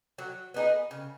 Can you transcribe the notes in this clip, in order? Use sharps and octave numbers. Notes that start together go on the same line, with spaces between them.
F#3
B3 D#4 G#4
C#3